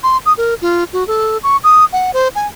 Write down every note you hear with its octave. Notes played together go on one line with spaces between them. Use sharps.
C6
D#6
A#4
F4
F#4
A4
C#6
D#6
F#5
C5
G#5